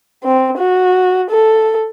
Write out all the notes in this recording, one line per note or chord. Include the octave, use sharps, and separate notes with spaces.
C4
F#4
A4